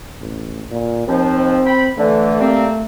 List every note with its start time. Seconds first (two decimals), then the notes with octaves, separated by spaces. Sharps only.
0.21 A1
0.71 A#2
1.08 D#2 F3 C4
1.66 G5 B5
1.98 D3 E3 A3
2.41 G3 A#3 C4